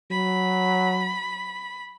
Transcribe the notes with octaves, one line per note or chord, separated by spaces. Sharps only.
F#3 B5